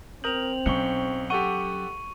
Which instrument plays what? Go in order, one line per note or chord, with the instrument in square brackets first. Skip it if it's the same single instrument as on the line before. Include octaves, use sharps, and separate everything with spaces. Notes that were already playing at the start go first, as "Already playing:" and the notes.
[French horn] C4 [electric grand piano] A#4 D#6 G6 [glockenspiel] F7 F#7
[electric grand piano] B1 C#6 [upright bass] F#3 C#4 [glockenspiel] C#7 G7
[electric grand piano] G4 A4 F#5 [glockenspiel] C#6 D#7